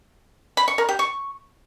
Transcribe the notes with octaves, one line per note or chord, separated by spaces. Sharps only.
B5
C#6
A#4
G4
C#6